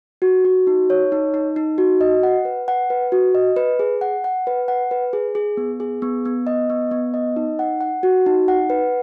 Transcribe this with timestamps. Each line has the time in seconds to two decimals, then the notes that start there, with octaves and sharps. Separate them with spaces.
0.22 F#4
0.45 F#4
0.67 D#4
0.90 C#5
1.12 D#4
1.34 D#4
1.56 D#4
1.78 F#4
2.01 D#5
2.23 F#5
2.45 B4
2.68 F#5
2.90 B4
3.12 F#4
3.35 D#5
3.56 B4
3.79 G#4
4.01 F#5
4.24 F#5
4.47 B4
4.68 F#5
4.91 B4
5.13 G#4
5.35 G#4
5.57 B3
5.80 G#4
6.02 B3
6.25 B3
6.47 D#5
6.70 B3
6.91 B3
7.14 D#5
7.36 D#4
7.59 F#5
7.81 F#5
8.03 F#4
8.26 D#4
8.48 F#5
8.70 B4